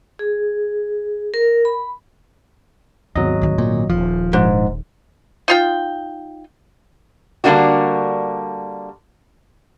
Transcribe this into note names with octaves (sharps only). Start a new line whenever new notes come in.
G#4
A#4
B5
G#1 D#2 F#3 B3 D#5
D2 D#3
A#2
D#1 F3
A#1 G#2
D#4 F4 G5
D3 G3 A#3 D4 F#4